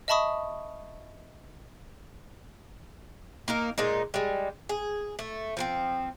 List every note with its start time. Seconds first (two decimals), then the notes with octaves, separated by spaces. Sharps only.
0.08 D#5 E5 A5 B5 C#6 D#6
3.48 A#3 D#4 A#4
3.78 A#2 G#3 D#4
4.14 G3 G#3
4.69 G#4
5.19 A3
5.57 F3 A#3 C4